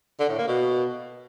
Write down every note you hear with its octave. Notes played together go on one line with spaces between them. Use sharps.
D3
A2
A#3
B2